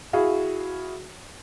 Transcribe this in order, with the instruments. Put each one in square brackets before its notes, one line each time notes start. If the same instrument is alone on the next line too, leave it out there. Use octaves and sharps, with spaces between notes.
[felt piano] E4 F#4 G#4 F5